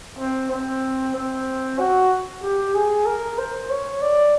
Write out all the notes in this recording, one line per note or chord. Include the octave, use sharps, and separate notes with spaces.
C4
C4
C4
F#4
G4
G#4
A#4
C5
C#5
D5